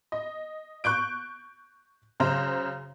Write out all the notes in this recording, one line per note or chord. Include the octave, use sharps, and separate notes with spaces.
D#5
C#6 F#6 G6 D7
F#2 C#3 C5 A#5